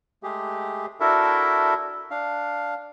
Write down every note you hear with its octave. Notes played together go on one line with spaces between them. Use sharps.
G#3 A3 G4 G#4
D4 E4 F#4 A4 A#4 E5
D4 F5